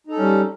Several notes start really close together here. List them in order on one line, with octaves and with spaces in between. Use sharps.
D#4 A4 C#4 G3